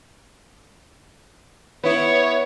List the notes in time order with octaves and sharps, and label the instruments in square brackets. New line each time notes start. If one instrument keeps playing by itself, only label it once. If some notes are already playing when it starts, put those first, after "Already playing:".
[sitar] B3 E4 [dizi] C#5